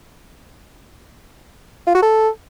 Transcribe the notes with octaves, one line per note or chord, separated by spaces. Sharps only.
F4
F#4
A4